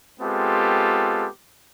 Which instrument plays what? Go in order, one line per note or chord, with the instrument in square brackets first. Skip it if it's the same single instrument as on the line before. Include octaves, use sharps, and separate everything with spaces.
[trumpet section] G#3 B3 C4 F4 G4 A4